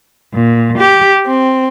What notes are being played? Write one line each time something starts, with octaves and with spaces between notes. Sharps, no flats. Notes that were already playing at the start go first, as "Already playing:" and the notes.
A#2
G4
C4